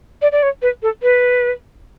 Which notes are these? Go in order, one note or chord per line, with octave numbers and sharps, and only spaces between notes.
D5
D5
C#5
B4
A4
B4